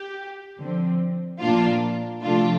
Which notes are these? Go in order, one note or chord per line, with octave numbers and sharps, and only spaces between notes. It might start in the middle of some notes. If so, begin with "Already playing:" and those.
Already playing: G4
D3 F3 C4
A#2 F3 A#3 D4 F4
C3 F3 A3 D4 F4